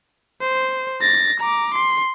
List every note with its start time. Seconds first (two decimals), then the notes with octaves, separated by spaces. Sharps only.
0.41 C5
1.01 A6 A#6
1.40 A#5 D6
1.74 C6